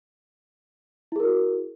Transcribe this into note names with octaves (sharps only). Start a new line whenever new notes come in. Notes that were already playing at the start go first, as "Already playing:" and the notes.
E4 F#4 G#4 A#4